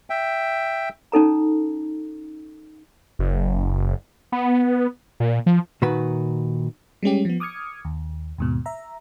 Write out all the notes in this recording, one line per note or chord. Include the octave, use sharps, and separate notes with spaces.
E5 G5
C#4 D#4 A4 A#5
F#1
B3
A#2
F3
A#2 D#3 F#4 B4 B5
G3 G#3 C#4 G4
F3 B3
D6 D#6 F6 G#6 C#7
D#2
D#2 G#2 B2
E5 A#5